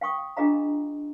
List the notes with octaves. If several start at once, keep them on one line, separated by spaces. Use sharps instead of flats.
F5 G5 C#6 D#6
D4 F4 G#4 D#5 F5 A#5